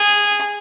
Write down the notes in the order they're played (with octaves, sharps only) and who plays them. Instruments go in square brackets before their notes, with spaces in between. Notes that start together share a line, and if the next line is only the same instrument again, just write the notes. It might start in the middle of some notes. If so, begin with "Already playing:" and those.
Already playing: [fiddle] G#4